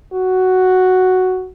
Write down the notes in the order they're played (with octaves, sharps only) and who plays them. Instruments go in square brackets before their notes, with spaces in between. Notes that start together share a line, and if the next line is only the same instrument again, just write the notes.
[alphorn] F#4